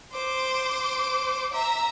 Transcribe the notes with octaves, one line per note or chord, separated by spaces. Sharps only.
C5 D6
E5 A#5